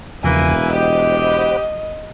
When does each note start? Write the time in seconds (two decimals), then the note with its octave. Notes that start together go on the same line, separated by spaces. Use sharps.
0.24 E1 E2 C#3 F3 A#3 B4 E5 G#5
0.73 G4 C5 D#5 F#5 B5